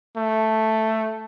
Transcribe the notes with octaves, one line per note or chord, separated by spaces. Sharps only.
A3